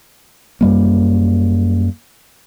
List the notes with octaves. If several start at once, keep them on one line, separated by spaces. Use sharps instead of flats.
F#2 G3 A#3